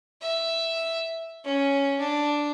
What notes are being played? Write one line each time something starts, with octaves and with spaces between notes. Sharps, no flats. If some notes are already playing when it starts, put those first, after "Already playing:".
E5
C#4
D4